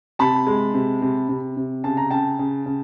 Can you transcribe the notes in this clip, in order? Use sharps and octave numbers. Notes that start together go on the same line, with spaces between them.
C3 A5 B5
G#3
C3
C3
C3
C3
C#3 A5
A#5
C#3 G5 A5
C#3
C#3